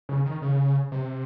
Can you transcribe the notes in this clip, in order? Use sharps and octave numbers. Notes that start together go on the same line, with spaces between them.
C#3
D#3
C#3
C3